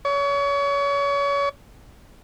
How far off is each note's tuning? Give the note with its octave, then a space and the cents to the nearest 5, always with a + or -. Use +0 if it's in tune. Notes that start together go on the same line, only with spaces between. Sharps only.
C#5 +30